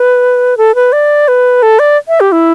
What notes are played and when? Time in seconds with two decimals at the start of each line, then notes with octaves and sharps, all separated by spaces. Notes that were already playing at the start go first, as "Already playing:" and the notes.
Already playing: B4
0.57 A4
0.75 B4
0.92 D5
1.28 B4
1.63 A4
1.79 D5
2.08 E5
2.20 G4
2.32 E4